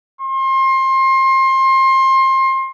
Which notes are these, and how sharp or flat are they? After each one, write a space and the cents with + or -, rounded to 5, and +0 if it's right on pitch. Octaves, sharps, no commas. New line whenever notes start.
C6 +30